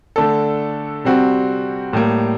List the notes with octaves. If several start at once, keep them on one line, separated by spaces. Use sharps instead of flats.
D3 A3 D4 A4
C3 G3 C4 F#4
A2 G3 A#3